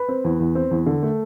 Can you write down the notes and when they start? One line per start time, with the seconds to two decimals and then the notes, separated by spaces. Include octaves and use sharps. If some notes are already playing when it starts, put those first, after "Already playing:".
Already playing: B4 B5
0.08 C4
0.24 E2
0.40 E2
0.55 C4
0.71 E2
0.86 D3
1.03 A3